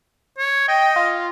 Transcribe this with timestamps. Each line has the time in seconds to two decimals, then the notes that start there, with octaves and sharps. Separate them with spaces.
0.38 C#5
0.68 D#5 G5
0.96 F4